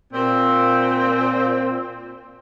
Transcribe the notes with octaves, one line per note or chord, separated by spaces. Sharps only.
A#2 C4